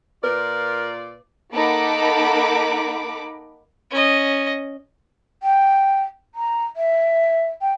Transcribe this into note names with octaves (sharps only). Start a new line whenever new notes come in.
A#2 F4 A#4 B4 D5
A#3 D#4 A4 F#5 B5 D6
C#4 D#5
G5
A#5
E5
G5